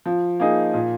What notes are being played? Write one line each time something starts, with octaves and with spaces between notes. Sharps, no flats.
F3
A#3 D#4 G#4
A#2